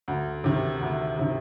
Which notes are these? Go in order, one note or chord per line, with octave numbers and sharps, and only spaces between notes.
D2
C3 D#3
D2
C3 D#3